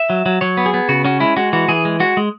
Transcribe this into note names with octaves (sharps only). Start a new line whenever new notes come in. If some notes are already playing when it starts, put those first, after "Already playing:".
Already playing: E5
F#3
F#3
F#3 C#5
B3
G#4
B3
C#3 F#4
C#4 F#4
G#3 E4
G#3 F#4
E3 F#4
E3 G#4
G#3
G#3 F#4
G#3